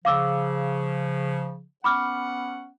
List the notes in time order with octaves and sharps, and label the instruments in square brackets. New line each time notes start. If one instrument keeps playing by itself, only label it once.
[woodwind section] C#3 F3 [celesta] F5 D6 E6
[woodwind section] B3 C#4 F#5 [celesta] B5 D6 F6